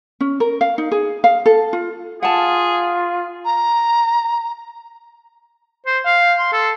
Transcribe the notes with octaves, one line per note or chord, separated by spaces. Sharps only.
C#4
A#4
F5
D#4
G#4
F5
A4
F4
F4 G#4 F#5 A5
A#5
C5
F5
C6
A4